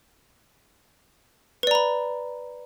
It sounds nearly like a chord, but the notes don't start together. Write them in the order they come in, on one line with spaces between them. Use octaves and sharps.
B4 D5 A#5 B5